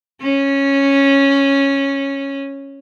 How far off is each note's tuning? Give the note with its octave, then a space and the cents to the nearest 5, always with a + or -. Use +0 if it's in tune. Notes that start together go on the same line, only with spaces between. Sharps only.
C#4 -5